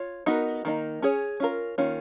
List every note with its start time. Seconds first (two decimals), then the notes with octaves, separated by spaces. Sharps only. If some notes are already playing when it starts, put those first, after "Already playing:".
Already playing: F4 C#5
0.26 B3 D#4 F#4 A#4
0.65 D#3 A#3 D#4
1.02 C#4 G#4 C#5
1.40 C#4 F4 A#4
1.78 D#3 A#3 C#4 F4